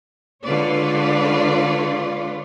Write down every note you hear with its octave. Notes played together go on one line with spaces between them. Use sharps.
D3 G#3 F4 B4 C#5 D5